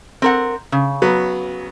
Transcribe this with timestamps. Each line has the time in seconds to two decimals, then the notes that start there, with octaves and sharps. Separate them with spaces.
0.22 C4 A#4 F#5
0.72 C#3
1.02 F#3 B3